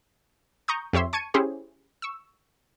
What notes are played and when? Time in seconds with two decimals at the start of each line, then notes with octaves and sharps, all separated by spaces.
0.68 A#5 C#6 D#6 G6
0.93 F2 G4 C#5 E5 C6
1.13 A5 C#6 G#6 C#7 D#7
1.34 C#4 E4 G4 G#4 C5 C#5
2.02 C#6 E6